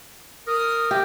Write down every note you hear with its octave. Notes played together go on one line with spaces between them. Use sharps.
A#4 D#6
G4